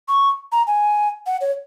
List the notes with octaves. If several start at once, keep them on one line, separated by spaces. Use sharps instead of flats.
C#6
A#5
G#5
F#5
C#5